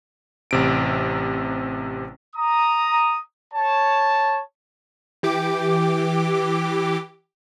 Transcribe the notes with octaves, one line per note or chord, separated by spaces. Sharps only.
A1 C3 D7
A#5 D#6
C#5 A5
E3 G4 D6